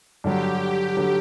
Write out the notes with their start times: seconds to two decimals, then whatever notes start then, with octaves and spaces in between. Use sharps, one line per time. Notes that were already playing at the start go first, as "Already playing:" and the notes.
0.24 G2 D3 F#3 G4
0.60 G4
0.97 D3 F#3